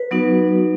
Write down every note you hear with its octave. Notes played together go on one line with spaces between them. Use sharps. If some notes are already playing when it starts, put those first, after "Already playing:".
Already playing: B4
F#3 B3 D#4 F#4